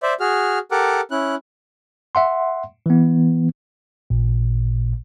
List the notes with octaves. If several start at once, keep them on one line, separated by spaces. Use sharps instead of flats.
C5 D5 E5
F#4 G#4 F6
G4 A4 A#4 F#5 D6
C#4 E4 F#6
E5 F#5 C6
E3 B3
A1 A#2